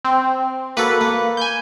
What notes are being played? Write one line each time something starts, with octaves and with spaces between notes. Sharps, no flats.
C4
A#3 F#4 A4 B4
A#3
G#5 G6